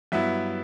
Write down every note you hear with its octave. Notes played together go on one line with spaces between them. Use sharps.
G2 F#3 B3 E4 E5